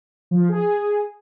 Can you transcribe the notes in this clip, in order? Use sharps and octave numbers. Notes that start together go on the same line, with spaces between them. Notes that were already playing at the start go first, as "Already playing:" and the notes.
F3
G#4